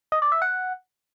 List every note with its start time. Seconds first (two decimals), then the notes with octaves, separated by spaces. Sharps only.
0.12 D#5
0.22 D5
0.32 E5
0.42 F#5